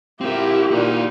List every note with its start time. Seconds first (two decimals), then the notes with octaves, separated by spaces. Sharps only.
0.21 C4 E4 F4 G4 A#4 E5
0.71 A#2 D#4 F4 F#4 D5